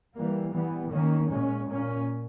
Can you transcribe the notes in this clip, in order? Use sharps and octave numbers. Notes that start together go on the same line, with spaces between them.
E3 G3 A#3
E3 G3 B3
D#3 A#3 C#4
A#2 G#3 C#4
A#2 A#3 C#4